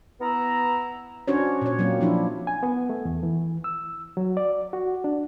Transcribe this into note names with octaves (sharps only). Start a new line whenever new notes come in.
B3 E4 A#5
C#4 D4 F#4 C5 C#5
A#2 C#5
F#3 A#3 C4
F3 D4 E4
G#5
B3
A3
E2
E3
E6
F#3
D5
F#4
D4